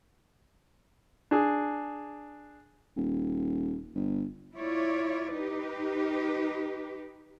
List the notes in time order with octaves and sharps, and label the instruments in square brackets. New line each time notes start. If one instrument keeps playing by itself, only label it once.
[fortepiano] D4 G#4
[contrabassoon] D#1
G1
[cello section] E4 F4 C#5 D5
D#4 G4 B4